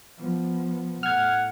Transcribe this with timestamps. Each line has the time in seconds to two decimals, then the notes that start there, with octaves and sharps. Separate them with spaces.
0.18 F3 B3
1.03 A2 F#5 F6 G#6